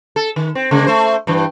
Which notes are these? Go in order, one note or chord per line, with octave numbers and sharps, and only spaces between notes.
A4
D#3
C4
C#3 G#3 A#3
A3 C5
G2 E3